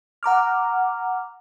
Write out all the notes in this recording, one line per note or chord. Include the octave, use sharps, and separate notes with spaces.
F#5 A#5 D6 F6